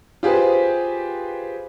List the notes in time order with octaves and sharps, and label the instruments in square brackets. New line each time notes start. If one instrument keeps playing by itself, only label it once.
[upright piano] F4 G4 G#4 B4 C5